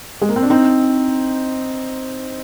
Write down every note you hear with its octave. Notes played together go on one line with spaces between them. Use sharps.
G#3
A#3
C4
D4
C4 D#4